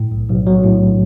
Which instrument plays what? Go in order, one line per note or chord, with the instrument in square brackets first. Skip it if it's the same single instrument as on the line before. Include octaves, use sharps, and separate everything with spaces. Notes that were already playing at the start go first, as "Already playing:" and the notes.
Already playing: [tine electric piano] A2
B1
B1
F#3
A2